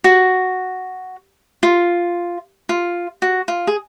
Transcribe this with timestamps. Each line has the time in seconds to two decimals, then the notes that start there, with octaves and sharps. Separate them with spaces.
0.04 F#4
1.63 F4
2.69 F4
3.22 F#4
3.48 F4
3.67 G#4